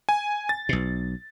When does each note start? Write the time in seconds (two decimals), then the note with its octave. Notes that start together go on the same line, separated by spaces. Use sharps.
0.09 G#5
0.49 A6
0.69 B1 B2